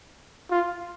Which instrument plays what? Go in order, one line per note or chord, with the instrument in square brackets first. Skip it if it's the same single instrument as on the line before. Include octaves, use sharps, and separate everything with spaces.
[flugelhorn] F4